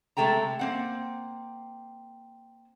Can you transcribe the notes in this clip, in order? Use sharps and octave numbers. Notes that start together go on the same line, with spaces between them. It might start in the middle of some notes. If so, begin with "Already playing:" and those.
C3 G#3 A3 A4 G5 A#5
A#3 C4 F#5